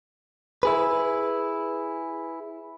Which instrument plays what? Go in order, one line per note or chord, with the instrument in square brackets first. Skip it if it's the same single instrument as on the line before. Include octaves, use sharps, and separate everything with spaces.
[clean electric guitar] E4 G#4 B4